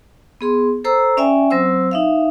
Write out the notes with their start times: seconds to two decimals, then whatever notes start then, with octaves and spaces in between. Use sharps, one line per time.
0.41 B3 G#4 C6
0.84 A4 C5 A#5 E6
1.17 C#4 D5 E5 G5 G#5
1.50 F#3 C4 C5 E6
1.91 D#4 E5 F5